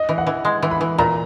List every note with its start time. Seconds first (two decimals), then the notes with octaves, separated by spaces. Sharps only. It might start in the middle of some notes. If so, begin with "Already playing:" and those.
Already playing: D#5
0.09 E3
0.18 F#5
0.27 E3
0.45 G#3
0.62 E3
0.71 B5
0.81 E3
0.98 A#2 A#5